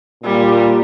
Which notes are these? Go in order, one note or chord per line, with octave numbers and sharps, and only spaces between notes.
A#2 G3